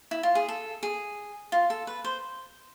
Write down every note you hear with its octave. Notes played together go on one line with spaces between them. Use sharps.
E4
F4
G#4
A4
G#4
F4
A4
B4
C5